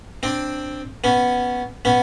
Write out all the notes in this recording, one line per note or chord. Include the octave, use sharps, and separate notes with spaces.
C4 D4
B3 C#4
B3 C#4